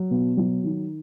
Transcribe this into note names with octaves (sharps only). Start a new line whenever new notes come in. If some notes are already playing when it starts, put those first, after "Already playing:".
Already playing: F#3
B2
F#3
D#3